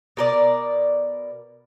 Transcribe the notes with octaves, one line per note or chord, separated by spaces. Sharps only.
B2 A#4 D5